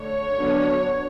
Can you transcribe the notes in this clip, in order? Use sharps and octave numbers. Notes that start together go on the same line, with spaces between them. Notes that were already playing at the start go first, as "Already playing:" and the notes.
Already playing: D3 A3 C#5
D3 F#3 B3 D4